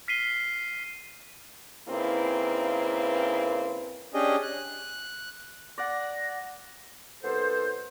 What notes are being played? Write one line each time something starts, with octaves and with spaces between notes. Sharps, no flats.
F6 B6 C7 D#7 G7
C#3 A#3 C4 D#4 E4 B4
C#4 D4 G4 G#4 D#5
F#6
D5 F#5 A#6
C2 B3 A4 C5